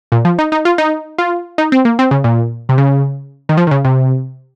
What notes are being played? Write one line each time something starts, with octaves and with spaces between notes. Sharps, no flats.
A#2
F3
D#4
D#4
F4
D#4
F4
D#4
C4
A#3
C4
C#3
A#2
C3
C#3
D#3
F3
D#3
C#3
C3